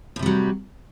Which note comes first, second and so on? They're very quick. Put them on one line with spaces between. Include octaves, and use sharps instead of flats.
A2 C3 G3 F#3